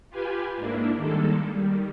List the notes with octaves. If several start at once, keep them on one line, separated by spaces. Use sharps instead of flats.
F4 G4 B4 G#5
G#2 A#3 D4 E4
D#3 G3 G#3 A#3 A4
D#3 G3